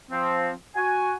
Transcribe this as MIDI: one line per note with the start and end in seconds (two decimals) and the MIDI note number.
0.11 0.51 53
0.11 0.51 60
0.76 1.15 66
0.76 1.15 80